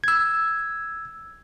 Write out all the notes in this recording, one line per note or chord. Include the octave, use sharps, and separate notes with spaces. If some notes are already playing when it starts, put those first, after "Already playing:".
E6 G#6